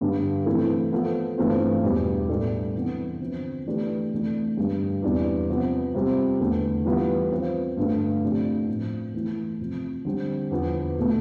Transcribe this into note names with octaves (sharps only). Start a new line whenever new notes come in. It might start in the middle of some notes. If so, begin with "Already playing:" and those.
G2 D3 G3
C3 E3 A3 E4 A4
F3 B3 F4 A4
G2 E3 A3 C4 F4
E2 B2 G3 D4
A2 G3 D4 A4
C3 E3 B3
D3 F3 C4
E3 A3 D4 G4 B4
F2 C3 E3 A3 D4
G2 D3 G3
E2 C3 E3 G3 D4
C3 F3 B3
C3 G3 C4 F4
E2 D3 A3
E3 G3 B3 F4 B4
F3 C4 F4 B4
G2 D3 A3
C3 F3 A3 D4 G4
A2 F3 C4
E3 A3 E4
F2 C3 F3
D3 G3 C4
E2 D3 F3 B3
B2 A3